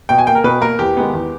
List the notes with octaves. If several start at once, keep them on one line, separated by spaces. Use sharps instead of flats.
B2 G5
G#5
A#3 G5
A#4
B2 B4
A#3 A#4
E2 G4
D#3 G#3 B3
E2